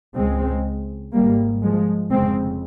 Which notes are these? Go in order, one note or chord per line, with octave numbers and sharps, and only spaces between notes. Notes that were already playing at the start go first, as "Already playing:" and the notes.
C#2 C#3 G#3 C4
G#1 G#2 G3 A#3
F3 G#3
F1 F2 C#3 G#3 C4